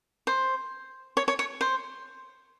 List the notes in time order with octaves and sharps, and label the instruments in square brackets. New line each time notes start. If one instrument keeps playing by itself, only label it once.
[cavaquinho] C5
C#5
C#5
C#5
C5